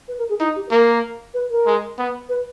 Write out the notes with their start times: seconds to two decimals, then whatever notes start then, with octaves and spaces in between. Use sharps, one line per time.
0.08 B4
0.18 A#4
0.29 G#4
0.40 D#4 E4
0.56 G4
0.67 B4
0.71 A#3 A#4
1.34 B4
1.50 A#4
1.66 G#3
1.98 B3
2.29 B4